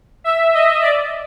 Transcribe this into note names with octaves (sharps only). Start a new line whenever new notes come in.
E5
D#5
D5